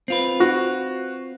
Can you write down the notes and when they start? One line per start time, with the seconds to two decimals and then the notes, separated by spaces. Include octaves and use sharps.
0.08 C4 F4 B4
0.40 F#4